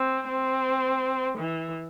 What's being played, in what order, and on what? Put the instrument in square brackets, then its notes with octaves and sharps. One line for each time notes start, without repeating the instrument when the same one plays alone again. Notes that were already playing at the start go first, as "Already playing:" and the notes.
Already playing: [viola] C4
C4
E3